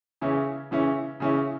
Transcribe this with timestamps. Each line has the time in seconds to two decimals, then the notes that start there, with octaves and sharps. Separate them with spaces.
0.21 C#3 E3 C#4 E4
0.71 C#3 E3 C#4 E4
1.20 C#3 E3 C#4 E4